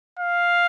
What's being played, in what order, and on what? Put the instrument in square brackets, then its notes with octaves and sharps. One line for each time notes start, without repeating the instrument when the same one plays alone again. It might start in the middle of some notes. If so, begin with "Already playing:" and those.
[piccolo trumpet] F5